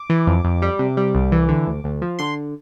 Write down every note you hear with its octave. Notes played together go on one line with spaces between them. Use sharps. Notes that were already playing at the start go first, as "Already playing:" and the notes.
Already playing: D6
E3
F2
F2
G3
C3
G3
C2
E3
D3
D2
D2
F3
D3 C6